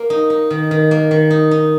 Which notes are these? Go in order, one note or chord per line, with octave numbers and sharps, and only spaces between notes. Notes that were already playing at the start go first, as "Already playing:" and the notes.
Already playing: A#3
D#4
D#4
D#3
D#3
A#3
D#3
D#4
D#4